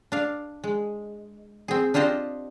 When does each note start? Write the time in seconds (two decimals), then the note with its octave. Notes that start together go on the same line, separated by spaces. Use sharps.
0.12 D4 F5
0.64 G#3
1.68 C4 G#4
1.94 D4 F4 G4 C5 D#5